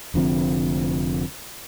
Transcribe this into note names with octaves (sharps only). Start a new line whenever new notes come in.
F1 D3 F3 C4